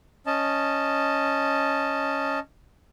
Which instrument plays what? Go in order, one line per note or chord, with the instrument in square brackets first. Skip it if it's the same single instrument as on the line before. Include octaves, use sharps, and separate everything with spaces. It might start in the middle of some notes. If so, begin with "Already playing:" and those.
[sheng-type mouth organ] C#4 D#5 A5